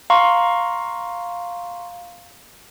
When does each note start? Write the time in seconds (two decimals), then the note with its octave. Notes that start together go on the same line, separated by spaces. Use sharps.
0.10 F5 A#5 C6 C#6